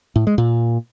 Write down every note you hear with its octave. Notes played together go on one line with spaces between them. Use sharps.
A2
G#3
A#2